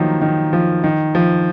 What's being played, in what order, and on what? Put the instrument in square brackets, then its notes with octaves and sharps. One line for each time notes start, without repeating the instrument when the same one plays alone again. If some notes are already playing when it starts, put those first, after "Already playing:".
Already playing: [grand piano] D#3 F3 F#3 A#3
D#3
F3
D#3
F3